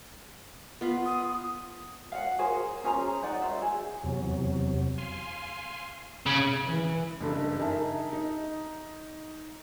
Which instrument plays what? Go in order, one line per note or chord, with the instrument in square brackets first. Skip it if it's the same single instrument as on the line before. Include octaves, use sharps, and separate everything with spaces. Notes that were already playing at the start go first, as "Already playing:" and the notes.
[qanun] B3 F4 B4
[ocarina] D#6
[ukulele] F5 F#5
G#4 A#4 C5
C#4 G#4 C5 A#5
D#4 D5 F#5
C5 E5
G#4
[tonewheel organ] E2 C3 F#3
F5 G#5 C6
[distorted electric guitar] C#3 [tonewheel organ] D#6
[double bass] E3
[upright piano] F#1 G2 A4
D#4 G#4 A#4 E5 A5
D#4